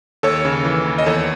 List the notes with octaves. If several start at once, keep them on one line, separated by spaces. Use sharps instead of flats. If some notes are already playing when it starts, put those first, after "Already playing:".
D#2 A4 C#5
C#3
E3
D#2
D#5
E2 A4 C#5